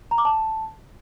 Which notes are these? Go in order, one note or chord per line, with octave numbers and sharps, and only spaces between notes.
A#5
D6
A5